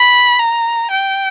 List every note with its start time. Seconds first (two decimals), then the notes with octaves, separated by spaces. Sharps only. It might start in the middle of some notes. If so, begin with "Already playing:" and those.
Already playing: B5
0.39 A#5
0.91 G5